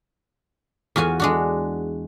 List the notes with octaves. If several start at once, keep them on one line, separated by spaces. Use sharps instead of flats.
E2 F4 F#4 G#5
G#3 D4 F#4